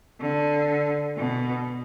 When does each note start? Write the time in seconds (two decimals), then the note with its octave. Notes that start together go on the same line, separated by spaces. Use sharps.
0.20 D3
1.17 B2